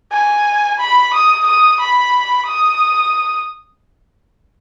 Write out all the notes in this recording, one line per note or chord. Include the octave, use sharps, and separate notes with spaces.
G#5
B5
D#6
D#6
B5
D#6